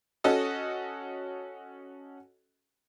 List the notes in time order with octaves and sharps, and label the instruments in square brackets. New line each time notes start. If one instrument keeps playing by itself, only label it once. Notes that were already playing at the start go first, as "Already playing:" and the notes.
[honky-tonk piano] C#4 F#4 A4 D#5